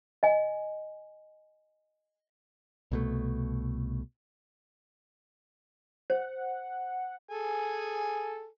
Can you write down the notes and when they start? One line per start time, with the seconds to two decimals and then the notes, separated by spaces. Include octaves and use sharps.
0.23 D#5 G#5
2.92 C2 B2 A3
6.10 C5 F#5
7.29 G#4 A4 G#5